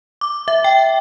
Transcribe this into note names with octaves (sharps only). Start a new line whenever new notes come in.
D6
E5
G5